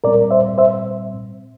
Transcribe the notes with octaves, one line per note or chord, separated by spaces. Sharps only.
A#2 G3 C4 A#4 D5
C5 E5
C5 E5